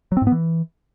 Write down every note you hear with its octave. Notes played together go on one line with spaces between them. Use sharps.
F#3
C4
G#2
B3
E3